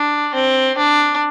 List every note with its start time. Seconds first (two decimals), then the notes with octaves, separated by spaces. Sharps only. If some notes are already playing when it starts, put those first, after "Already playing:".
Already playing: D4
0.34 C4
0.78 D4